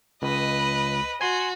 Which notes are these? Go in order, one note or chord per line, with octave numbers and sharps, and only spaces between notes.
C#2 B4 D#5
F#4 G#5 C6